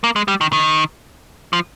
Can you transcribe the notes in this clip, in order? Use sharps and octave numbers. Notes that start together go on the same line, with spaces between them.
A#3
G#3
G3
D#3
D#3
F3